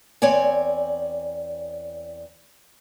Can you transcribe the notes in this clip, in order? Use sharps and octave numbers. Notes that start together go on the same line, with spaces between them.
E2 C4 C#5 D5 G#5